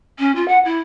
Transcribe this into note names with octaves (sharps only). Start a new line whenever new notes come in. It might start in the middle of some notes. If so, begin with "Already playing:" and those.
C#4
F4
F#5
E4